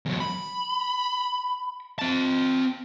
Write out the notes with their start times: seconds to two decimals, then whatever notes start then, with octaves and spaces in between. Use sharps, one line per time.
0.06 E2 F#3
0.20 B5
1.99 C4 A5